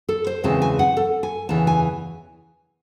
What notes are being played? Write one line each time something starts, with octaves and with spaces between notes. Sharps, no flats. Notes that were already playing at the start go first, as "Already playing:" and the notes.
A4
C5
E2 C#3 E3 G#3 C4 A5
G#5
F#5
A4
G#5
E2 C#3 E3 A5
G#5